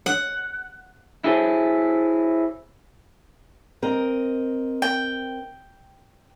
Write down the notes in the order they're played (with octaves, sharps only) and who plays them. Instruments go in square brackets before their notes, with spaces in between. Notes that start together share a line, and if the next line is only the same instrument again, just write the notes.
[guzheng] F#5
[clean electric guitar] E4 F#4 G#4 A4 C5 C#5
[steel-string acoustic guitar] C4 A#4 D#5
[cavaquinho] G5